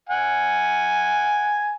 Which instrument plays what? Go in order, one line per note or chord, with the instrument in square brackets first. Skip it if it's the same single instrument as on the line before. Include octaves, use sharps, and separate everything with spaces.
[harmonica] F#5 G#5